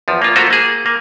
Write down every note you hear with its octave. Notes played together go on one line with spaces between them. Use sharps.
E2 F3
A#3 F4
A3 A#3 F4 F#4 C5
A#3 G#4
A#3